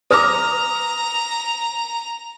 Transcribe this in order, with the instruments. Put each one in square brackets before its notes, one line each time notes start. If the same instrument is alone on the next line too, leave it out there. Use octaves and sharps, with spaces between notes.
[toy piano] B4 D6 [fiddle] A#5 [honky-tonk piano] D#6 F6 A#6